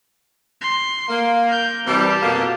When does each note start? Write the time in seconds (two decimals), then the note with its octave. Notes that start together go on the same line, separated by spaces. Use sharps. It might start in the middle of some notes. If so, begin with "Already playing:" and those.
0.61 C6
1.09 A#3
1.47 A#4 G6
1.87 C3 E3 G3 G4 A5
2.20 F2 B2 A#3